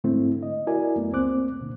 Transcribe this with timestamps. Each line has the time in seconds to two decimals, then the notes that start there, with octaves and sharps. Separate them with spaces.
0.04 G#2 D3 A3 C4 E4
0.43 D#5
0.67 E4 F#4 A#4 D5 G#5
0.96 F#2 A3 B3
1.12 C#2 A#3 C4 C5 D6 F#6
1.61 A#2 D3